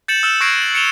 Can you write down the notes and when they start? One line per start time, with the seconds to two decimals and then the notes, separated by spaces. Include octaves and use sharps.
0.08 G6 A6 C#7 E7 F#7
0.23 E6 F6 E7
0.41 C#6 F#6 G#6 A#6 C7 D7
0.62 F#7
0.75 C#7 D7 E7 F7 G7